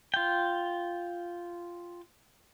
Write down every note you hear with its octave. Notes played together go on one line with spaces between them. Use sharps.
F4 G5